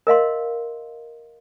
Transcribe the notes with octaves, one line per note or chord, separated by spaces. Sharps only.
A#4 D#5 F5 C6